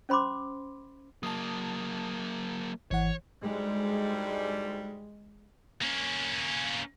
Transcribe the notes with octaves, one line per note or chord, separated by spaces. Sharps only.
C#4 C5 B5 C6 D6
F#3 A#3 A5 D#6
G#1 E3 C#5 F#5
D2 G#2 G3 G#3
A#3 C#4